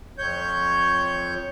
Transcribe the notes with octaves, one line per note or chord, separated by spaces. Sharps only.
F2 C#5 G6